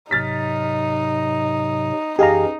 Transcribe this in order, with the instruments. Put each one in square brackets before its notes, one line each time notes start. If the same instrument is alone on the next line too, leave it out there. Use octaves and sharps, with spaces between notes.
[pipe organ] G#2 C3 F#3 [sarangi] D#4 [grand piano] F6 A6 B6
[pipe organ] F#2 E3 [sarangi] D#4 [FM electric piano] G4 A#5 [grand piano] G#4 D#5 F5